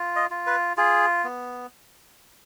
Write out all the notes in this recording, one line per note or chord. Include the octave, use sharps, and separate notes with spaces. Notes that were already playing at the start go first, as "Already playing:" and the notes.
Already playing: F4
D#5
F4
B4
F4 G#4
B3